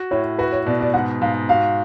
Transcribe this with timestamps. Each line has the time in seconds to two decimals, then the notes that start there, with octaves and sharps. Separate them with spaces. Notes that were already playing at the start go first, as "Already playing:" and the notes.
Already playing: F#4
0.11 A2 C#5
0.39 F#4 B4
0.52 C#5
0.66 B2 D5
0.81 D5
0.94 G#2 F#5
1.21 G#2 F5
1.49 F#4 F5